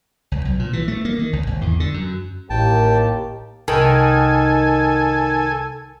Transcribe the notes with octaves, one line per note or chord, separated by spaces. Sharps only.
C#2
B1
A#2
E3
A3
A#3
D#3
C#2
G#1
E2
D3
F#2
A1 D#2 A2 A#3 G4 G5 A5
C2 D#3 A4 G#5